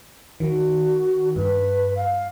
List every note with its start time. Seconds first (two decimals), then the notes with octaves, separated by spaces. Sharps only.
0.40 D#3 F#4
1.36 G2 B4
1.95 F5